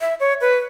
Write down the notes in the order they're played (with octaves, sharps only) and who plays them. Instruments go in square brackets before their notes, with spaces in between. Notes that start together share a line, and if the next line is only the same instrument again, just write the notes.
[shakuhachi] E5
C#5
B4